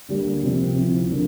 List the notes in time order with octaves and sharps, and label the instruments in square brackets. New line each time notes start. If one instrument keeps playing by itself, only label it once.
[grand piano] D3 G3 A#3 D4 G4
C3 F3 C4
F3 C4 E4
D3 F3 A#3